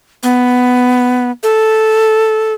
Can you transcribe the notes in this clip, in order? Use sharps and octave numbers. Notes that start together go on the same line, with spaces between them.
B3
A4